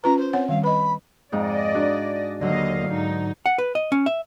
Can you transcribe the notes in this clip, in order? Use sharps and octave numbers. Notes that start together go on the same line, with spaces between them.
C#4 F4 B4 A#5
C5
C4 C#5 F#5
D#3 G3 F5
B4 D#5 B5
F2 G#2 D#4 D5 D#5
D4 F#4 G#4
D#2 D3 F#3 D#5 F5
G#2 D#4
F#5
B4
D#5
C#4
E5